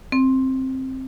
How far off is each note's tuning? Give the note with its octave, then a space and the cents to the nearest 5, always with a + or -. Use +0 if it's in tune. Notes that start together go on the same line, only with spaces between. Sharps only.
C4 +10